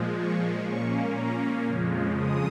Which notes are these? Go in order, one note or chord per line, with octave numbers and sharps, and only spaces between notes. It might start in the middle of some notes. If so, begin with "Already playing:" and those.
Already playing: A#2 F3 G#3
C#6
A#2 A#3 C#4 C#6
A#5
F2 C#3 F3 G#3
D#6